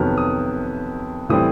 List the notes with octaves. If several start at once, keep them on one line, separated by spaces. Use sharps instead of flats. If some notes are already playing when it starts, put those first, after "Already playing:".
Already playing: F2 C3 D#3 F#3 B3 F6
D#6
A2 E3 G3 C4 D#6